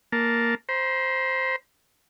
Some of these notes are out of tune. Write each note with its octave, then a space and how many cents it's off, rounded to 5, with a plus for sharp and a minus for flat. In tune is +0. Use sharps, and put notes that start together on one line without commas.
A#3 +0 A5 +0
C5 +0 A#5 +45